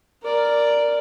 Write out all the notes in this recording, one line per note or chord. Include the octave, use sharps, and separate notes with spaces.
A#4 D5